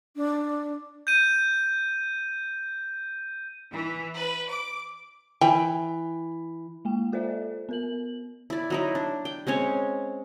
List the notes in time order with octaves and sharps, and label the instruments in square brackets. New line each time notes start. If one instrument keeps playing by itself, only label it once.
[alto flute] D4
[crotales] G6 D#7
[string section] E3
B4
D6
[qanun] E3 [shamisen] G5
[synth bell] G#3 A#3 G5
F4 A4 C5 D5 E5
B3 A#4 F#7
[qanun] E4 D5
F#3 D#4 E4
D4
G5
G#3 C4 C#4 C#5